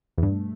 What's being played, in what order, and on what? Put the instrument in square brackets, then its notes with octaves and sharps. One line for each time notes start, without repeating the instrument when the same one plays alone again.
[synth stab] E2
[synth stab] G2 [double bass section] B2 A3